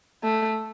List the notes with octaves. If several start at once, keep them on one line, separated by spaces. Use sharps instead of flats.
A3